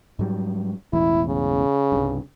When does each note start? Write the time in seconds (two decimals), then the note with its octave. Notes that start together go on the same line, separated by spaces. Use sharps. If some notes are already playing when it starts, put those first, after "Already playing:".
0.19 G#2 F#3 G3
0.93 E1 A1 E2 E4
1.28 C#3
1.92 C2 G2